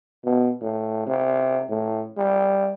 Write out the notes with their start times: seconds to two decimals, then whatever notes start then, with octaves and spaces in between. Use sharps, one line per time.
0.25 B2
0.62 A2
1.07 C3
1.69 A2
2.18 G3